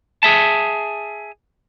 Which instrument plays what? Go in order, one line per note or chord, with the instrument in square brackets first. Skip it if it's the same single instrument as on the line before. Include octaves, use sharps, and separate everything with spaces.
[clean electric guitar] G#4 E5 A5